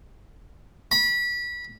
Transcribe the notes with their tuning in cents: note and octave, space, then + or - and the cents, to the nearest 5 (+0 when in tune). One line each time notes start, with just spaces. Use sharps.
B5 -25